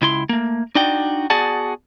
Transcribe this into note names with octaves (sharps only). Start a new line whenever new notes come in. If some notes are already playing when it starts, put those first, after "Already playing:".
C#2 E4 C6
A3 A#3
D4 D#4 F#4 D5 G5
B3 F#4 G#4 D5 F#5 A5